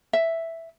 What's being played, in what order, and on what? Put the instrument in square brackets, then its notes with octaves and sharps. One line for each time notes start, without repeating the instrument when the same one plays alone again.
[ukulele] E5